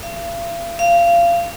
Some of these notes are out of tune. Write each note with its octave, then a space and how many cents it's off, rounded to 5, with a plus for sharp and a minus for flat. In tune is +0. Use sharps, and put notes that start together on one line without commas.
F5 -45
F5 -25